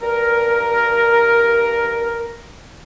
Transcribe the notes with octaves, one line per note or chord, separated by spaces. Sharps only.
G2 A#4